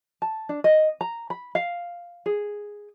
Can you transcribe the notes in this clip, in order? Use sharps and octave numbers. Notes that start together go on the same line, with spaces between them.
A5
D4
D#5
A#5
B5
F5
G#4